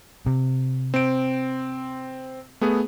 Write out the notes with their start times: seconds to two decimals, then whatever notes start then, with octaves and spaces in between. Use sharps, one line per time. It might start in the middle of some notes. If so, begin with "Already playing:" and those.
0.26 C3
0.94 C4 D7
2.61 A3 B3 G#4